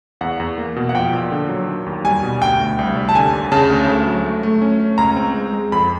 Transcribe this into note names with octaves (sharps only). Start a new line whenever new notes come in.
E2 F#5
E2
A#3
B2
F#5
F3 G5
A#2
D3
F#3
D#3
D#2
G3 G#5
B2
D2 G5
D2
C2
G3
A5
D3 G#5
D#2
C#3 A5
D2
A3
F#3
A3
A3
C#4
C#4
C#2 A#5
C4
G#3
G#3
F2 B5